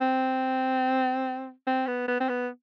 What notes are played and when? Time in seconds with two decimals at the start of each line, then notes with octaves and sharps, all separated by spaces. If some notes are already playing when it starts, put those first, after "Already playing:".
0.01 C4
1.67 C4
1.87 B3
2.08 B3
2.20 C4
2.29 B3